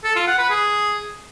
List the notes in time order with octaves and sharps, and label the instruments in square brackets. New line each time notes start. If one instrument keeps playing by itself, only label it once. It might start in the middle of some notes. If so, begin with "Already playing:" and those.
[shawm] A4
F4
F#5
B4
G#4